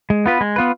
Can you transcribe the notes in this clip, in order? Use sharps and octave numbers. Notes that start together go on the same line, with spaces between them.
G#3
B3 F4 B4
G#3
B3 F4 B4